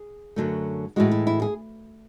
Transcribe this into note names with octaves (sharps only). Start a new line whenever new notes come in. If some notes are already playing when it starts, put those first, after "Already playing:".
Already playing: G#4
F#2 D3 F#3 A3
A2 E3 G#3 F#4
E4
E4
G#4